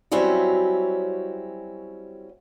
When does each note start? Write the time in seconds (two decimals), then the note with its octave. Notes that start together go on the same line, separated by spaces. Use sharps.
0.12 F#3 G3 C4 C#4 E4 F#4